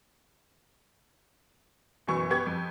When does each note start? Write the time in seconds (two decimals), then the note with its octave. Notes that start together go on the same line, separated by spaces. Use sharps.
2.07 F#1 B2 E3 C#6
2.30 B3 G4 C#6 G#6
2.46 F2